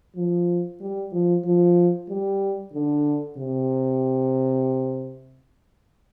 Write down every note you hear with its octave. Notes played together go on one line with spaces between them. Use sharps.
F3
G3
F3
F3
G3
D3
C3